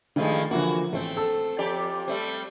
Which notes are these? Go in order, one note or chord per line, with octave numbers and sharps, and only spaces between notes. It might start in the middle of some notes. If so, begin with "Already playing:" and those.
G2 D#3 F3 G#3 A3
D3 E3 F3 A#3 F#4
A1 A3 C4
A4 E6
F2 G4 D5
G3 A3 C4